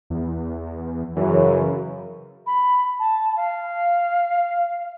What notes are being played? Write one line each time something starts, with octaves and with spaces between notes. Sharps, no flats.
E2
F#2 C#3 E3
B5
A5
F5